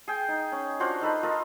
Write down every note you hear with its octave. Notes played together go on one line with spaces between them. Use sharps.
G#4 G5
D#4
C#4
D4 F4 F#4 C5
D#4 A4 B4 D#5
F4 A4 A#4 D#5